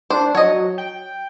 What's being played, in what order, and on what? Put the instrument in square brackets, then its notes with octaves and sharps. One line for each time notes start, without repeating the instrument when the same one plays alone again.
[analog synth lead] D4 [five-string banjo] C5
[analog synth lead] F#3 [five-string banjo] C#5 D#5
[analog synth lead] G5